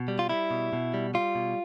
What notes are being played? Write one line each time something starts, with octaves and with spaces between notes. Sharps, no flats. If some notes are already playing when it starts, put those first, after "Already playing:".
Already playing: B2
G3
F4
G3 E4
B2
B2
G3
G3 F4
B2